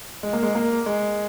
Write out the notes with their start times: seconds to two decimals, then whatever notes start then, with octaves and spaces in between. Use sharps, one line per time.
0.23 G#3
0.33 A#3
0.43 G#3
0.55 A#3
0.86 G#3